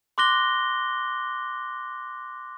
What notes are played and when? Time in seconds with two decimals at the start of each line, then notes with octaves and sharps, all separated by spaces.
0.18 C6 D6 F#6 A#6 G7